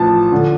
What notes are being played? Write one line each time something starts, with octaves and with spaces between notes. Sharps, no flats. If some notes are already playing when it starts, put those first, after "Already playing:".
Already playing: A1 F3 A5
D3